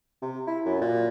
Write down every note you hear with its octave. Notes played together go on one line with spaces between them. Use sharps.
C3
E4
F#2
A#2